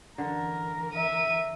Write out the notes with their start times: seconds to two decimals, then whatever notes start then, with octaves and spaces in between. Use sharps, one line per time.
0.18 D3 E3 A#4
0.95 E5 D#7